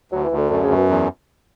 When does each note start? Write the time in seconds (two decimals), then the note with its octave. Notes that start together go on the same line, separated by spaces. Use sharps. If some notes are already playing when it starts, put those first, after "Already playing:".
0.12 D2 F#3
0.24 E3
0.31 D2
0.37 D3
0.50 F#2 D3
0.63 C#3
0.69 F#2
0.76 B2
0.89 E2